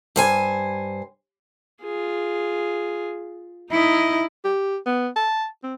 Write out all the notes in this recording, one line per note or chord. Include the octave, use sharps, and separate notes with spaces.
G2 C5 G#5
F4 G#4
D#4 E4 D#5
G4
B3
A5
C4